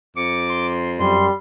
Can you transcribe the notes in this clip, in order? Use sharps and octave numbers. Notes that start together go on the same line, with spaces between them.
F2 D6 C#7
C6
F#2 G3 C6